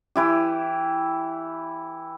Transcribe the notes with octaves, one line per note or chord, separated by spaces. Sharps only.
E3 E4 G4